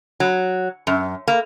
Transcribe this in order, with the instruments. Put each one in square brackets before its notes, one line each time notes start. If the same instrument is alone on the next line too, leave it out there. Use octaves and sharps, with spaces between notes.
[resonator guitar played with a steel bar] F#3
F#2
A#3